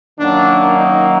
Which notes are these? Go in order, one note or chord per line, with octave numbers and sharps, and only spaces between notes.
F#2 D#3 F#3 A#3 D4
D#4